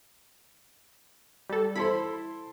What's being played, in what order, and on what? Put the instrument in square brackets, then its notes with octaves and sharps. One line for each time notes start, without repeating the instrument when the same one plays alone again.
[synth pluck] G3 A4
[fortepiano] E4 A4 C5 [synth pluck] B5